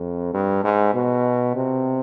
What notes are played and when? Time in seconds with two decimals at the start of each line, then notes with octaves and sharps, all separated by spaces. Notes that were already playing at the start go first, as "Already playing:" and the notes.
Already playing: F2
0.34 G2
0.64 G#2
0.94 B2
1.55 C3